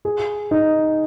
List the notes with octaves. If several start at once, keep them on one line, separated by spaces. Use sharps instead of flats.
G#4
D#4